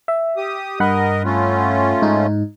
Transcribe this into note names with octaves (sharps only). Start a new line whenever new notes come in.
E5
G4 D#6
G2 A#4 D#5 F#5 B5
A3 C#4 F4
G#2 D#4